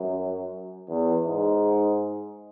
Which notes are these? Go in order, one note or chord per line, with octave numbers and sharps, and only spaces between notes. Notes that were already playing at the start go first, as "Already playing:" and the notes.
Already playing: F#2
E2
G#2